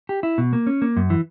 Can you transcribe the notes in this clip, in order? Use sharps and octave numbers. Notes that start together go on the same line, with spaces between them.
G4
E4
B2
A#3
C#4
A#3
F#2
E3